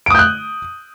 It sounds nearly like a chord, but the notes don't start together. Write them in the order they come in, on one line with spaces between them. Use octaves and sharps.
D7 D#6 G6 F#6